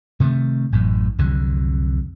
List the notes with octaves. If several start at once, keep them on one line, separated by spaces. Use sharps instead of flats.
C3 D#3 G#3 A3
A1 F#2 A2
C2 F2 D3 F#3